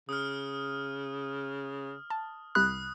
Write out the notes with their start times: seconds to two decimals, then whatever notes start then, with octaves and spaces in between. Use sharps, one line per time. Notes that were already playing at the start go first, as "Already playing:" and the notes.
0.09 C#3 D#6 F6
2.10 A5
2.55 C2 C3 B5 D#6 F#6